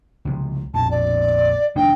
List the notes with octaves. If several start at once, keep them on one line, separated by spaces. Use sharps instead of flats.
C#2 C3 F3
A#1 F2 B2 A5
D5
F1 D#3 D4 G5